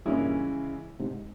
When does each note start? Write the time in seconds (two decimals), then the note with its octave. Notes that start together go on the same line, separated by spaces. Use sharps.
0.05 G2 A#2 C#3 E3 G#3 C#4 E4
1.00 G#2 C3